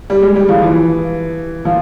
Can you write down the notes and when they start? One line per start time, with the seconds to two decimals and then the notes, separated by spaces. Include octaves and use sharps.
0.10 G3
0.22 G#3
0.36 G3
0.49 F3
0.62 E3
1.65 F3